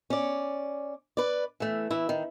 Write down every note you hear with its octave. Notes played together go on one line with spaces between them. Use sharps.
C#4 D5
B4 D5
E3 A3
E3 E4
D#3